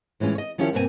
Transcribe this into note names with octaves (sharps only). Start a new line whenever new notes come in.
A2 E3 G#3 C#4 F4
C#5 D#5
D#3 F3 C#4 E4 G4 C#5
G2 B2 A#3 C4 E4 G#5